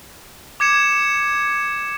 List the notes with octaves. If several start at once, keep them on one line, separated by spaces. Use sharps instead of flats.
D6 G#6 C#7 E7